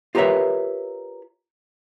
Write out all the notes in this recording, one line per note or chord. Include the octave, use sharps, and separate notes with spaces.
F4 G4 A#4 B4 C#5 E5